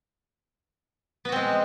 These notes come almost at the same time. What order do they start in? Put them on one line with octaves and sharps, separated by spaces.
B3 F#4 C4 G#3